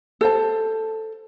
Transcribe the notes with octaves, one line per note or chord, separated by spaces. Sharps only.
A4 C5 A5